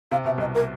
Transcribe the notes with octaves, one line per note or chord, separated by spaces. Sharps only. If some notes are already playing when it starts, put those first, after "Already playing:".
C3 F5
B2 E5
C2 C3 D#5
A#4